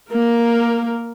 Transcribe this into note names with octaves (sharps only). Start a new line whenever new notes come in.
A#3 A#4